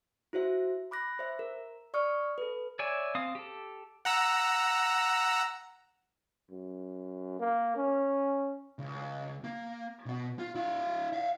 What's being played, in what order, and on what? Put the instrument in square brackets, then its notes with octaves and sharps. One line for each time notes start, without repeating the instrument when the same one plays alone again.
[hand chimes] E4 F#4 C5 E5
B5 D6 F#6 A#6
C5 E5
A#4
D5 C#6 D#6 F6 C#7
A4 B4
[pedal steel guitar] C#5 D5 E5 G#5
C4 F5 D#6
G4 A4
[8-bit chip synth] F#5 A#5 E6
[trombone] F#2
A#3
C#4
[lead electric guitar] C#2
A#3
B2 B3
F4
E4 F5
E5 F5